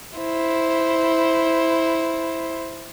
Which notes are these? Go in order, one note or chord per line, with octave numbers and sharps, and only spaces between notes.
E4 C5